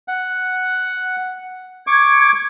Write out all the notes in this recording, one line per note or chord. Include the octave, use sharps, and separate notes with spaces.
F#5
C#6 D6 G#6